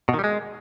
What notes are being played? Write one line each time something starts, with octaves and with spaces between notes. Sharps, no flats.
B2
D#3
G3
G#3